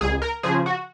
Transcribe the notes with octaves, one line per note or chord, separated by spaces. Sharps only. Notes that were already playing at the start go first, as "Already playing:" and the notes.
C#2 G#4
A#4
C#3 F3 G#4
F#4